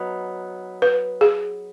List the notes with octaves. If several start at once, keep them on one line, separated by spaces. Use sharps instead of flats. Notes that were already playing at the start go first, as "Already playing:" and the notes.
Already playing: F#3 B3 D#4
B4
G#4